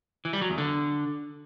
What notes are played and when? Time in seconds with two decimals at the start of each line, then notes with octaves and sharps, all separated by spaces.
0.25 E3
0.33 G3
0.41 F#3
0.50 E2
0.58 D3